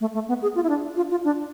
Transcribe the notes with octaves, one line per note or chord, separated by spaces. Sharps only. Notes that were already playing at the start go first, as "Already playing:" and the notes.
A3
A3
B3
G#4
F4
E4
D4
F4
F4
D4